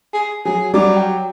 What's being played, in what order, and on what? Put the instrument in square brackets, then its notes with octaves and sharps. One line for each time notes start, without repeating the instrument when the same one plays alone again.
[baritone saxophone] G#4
[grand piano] F#3 [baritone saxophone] G#4
[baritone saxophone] F#3 [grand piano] G3 D5 D6
[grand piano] G5